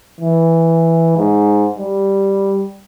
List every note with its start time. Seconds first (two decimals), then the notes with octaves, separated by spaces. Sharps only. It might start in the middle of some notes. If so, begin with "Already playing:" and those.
0.20 E3
1.17 G#2
1.78 G3